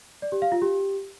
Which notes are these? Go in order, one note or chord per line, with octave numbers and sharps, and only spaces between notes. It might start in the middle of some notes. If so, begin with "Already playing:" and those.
D5
G4
F5
F4
G4